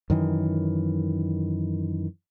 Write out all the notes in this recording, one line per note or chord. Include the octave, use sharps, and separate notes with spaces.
F#2 D#3 E3